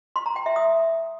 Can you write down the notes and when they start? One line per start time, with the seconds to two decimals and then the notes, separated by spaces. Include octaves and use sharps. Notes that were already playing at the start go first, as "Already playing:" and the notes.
0.16 C6
0.26 A#5
0.36 G5
0.46 E5
0.56 D#6